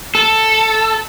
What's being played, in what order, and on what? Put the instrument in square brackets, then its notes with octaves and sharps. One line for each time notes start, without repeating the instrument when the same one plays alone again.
[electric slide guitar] A4